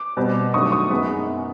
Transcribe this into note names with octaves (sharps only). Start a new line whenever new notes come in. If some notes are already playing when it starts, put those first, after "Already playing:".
Already playing: D6
B2 G3 C4
G2 D#3 F#3 A3 C#6 D#6
C#6 D#6
F#2 D#3 G#3 B3